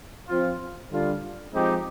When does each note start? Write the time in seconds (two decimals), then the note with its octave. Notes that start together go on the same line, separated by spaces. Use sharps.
0.28 F3 C4 F4
0.90 D3 G3 D4 F4
1.53 F3 G#3 C4 D#4 G4